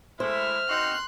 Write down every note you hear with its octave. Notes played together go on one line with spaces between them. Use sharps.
G#3 A3 E4 C5 E5 F6
C4 D#4 F#4 C6 F#6